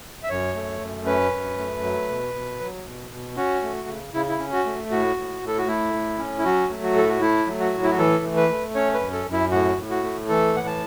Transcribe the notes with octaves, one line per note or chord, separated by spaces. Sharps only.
E5
F#2 C#5
A3
F#2
C#4 B4
F#2
A3
F#3
B2
B2
F#3
B2
B2
C#4 F#4
A3
C#3
C#3 E4
E4
C#4
F#4
A3
A2 F#4
A2
A2 A4
F#4
A3 E4
A2
C#4
E4
F#3 F#4
A3
F#4
A2 A4
F#4
A3 E4
F#3
F#4
A2
E4
F#4
E3 A4
A3
B4
A3
C#4 C#5
B4
F#2
A4
F#2
E4
A2 F#4
A2
F#4
A3
E3 A4
A2 F#5
A5